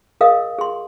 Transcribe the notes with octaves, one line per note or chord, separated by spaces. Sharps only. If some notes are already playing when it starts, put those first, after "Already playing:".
G#4 A#4 D#5 F5 D#6
G#4 C6